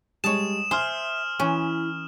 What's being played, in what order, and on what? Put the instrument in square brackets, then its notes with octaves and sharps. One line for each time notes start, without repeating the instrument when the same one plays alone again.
[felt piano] G3 G#3 [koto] C#5 A5 [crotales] D#6 E7
[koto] C5 [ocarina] E5 [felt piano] G#5 C6 [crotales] D#6 F6
[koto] E3 C#4 [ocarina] E4